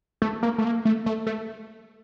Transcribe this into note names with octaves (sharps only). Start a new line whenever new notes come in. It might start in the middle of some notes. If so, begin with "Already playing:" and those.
A3
A#3
A3
A#3
A3
A3
A3